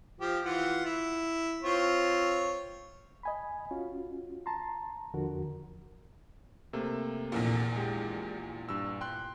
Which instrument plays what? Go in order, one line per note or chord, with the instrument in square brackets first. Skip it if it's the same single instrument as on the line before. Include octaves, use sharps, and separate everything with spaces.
[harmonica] F3 G4
E3 F4 F#5
E4
C4 F4 C#5
[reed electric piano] D#5 G#5 B5
C#4 F4 F#4
A5 A#5 C6
E2 D3 F3 F#4 A#4
[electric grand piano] C3 A3 A#3
[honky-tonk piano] A#1 E2 A#2
[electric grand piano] G#3 G4
G2 E6
G5 C6 F#6